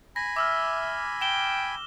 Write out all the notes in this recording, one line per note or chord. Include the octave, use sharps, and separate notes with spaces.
G#5 B5 A#6
E5 D6 E6 F6
G5 E7 G7